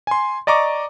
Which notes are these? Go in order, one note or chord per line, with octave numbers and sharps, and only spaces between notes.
G#5 C6
D5 D#5 A#5 C#6 D6